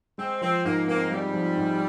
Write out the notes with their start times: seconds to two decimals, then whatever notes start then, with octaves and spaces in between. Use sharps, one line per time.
0.18 G#3 C4
0.41 F3 C4
0.65 G#2 A#3
0.88 A#3 C4
1.11 G3 G#3
1.34 F3
1.57 G#2